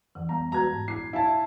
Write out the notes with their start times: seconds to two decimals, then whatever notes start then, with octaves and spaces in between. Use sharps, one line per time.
0.15 F2 E3
0.29 G3 B3 A#5
0.52 G#3 F#4 B4 A#5 G#6
0.73 G#2
0.88 A#2 D4 E4 C7
1.13 E4 F5 G#5 A5